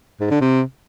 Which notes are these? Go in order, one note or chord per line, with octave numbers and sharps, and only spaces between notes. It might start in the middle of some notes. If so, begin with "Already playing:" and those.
G#2
D3
C3